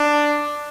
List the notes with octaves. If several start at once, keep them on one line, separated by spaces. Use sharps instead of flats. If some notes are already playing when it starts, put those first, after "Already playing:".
Already playing: D4